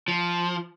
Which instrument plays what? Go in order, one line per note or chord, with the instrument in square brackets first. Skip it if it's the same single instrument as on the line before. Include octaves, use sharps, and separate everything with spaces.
[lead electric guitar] F3